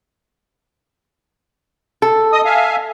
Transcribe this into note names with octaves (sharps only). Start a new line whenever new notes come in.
A4
D#5 D#6
E5 F5 G#5